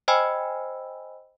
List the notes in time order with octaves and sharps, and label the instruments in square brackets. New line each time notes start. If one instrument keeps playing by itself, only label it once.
[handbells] C5 D#5 G5 G#5 B5 E6